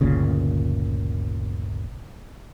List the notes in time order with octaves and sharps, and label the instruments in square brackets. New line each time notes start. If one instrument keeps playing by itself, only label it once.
[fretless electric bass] G1 D2 A#2 C#3